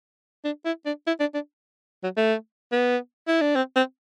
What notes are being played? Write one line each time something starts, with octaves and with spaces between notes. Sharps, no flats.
D4
E4
D4
E4
D4
D4
F#3
A3
B3
E4
D4
C4
C4